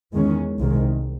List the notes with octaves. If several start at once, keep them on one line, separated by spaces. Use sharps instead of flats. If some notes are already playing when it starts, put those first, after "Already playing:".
E2 D#3 G#3 C#4
C2 C3 D#3 G#3